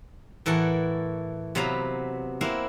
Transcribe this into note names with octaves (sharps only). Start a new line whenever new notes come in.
A2 E3 A4 A#4 F#5
C3 F#3 B3 B4 F5 A#5
A#3 C4 E4 F5 F#5